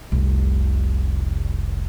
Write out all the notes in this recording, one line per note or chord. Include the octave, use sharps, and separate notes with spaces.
F1 C2